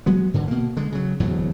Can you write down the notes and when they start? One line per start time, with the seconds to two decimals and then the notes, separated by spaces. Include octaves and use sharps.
0.06 F#3 G#3 B3
0.34 G#2 D3 E3
0.48 B2 A#3
0.77 D3 G#3
0.92 C#3 F#3
1.20 D1 E2 A2 F#3